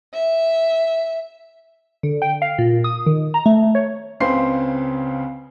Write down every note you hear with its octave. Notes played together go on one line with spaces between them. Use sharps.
E5
D3
G5
F5
A#2
D#6
D#3
A#5
A3
C#5
C#2 C#3 C4 B4 C6 C7